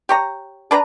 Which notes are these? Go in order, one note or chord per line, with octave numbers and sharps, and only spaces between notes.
G4 C#5 A#5
D4 B4 G#5 A#5